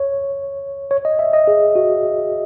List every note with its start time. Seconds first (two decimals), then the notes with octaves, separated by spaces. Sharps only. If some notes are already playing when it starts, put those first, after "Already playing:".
Already playing: C#5
0.91 C#5
1.05 D#5
1.19 E5
1.33 D#5
1.47 G#4
1.76 F#4